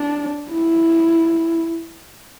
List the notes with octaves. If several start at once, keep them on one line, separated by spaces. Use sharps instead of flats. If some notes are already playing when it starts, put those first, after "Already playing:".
Already playing: D4
E4